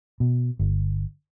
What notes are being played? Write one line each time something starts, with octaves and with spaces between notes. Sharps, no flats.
B2
G1